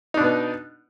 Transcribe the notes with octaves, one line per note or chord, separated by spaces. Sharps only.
B2 B3 D4 D#4